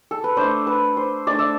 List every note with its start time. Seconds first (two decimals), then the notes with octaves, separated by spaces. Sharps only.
0.11 A4
0.24 B4
0.37 A3 D4 C5
0.67 B4
0.97 C5
1.27 A3 D4 D5
1.39 E5